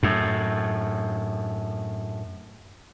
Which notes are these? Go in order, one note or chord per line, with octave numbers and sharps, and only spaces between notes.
F#2 A2